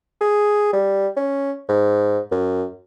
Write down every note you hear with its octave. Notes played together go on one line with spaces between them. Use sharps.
G#4
G3
C#4
G#2
F#2